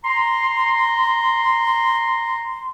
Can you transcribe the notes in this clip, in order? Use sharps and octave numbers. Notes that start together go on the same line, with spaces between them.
A#5 C6